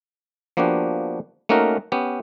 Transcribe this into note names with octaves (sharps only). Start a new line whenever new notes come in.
F3 A#3 B3 D4 F#4 G4
A3 A#3 C#4 D#4 F#4 A#4
B3 C#4 G4